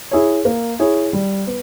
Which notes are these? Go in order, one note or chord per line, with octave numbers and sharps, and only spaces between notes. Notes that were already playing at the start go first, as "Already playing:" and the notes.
E4 G#4 C#5
A#3
E4 G#4 C#5
G3
B3